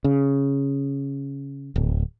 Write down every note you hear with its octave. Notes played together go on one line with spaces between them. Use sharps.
C#3
D1